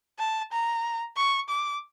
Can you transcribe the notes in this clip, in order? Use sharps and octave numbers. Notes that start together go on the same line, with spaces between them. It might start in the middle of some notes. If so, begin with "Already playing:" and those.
A5
A#5
C#6
D6